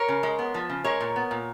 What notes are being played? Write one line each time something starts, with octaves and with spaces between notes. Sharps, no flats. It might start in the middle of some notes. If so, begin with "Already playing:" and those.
Already playing: A#4 C#5
C#3
G#3
B3
F3
C#3
G#3 A#4 C#5
A#2
B3
A#2